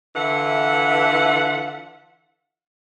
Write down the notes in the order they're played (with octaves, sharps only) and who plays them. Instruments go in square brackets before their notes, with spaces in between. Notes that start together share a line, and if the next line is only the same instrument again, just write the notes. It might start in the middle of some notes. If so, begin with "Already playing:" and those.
[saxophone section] D3 E3 F4 E5 F#5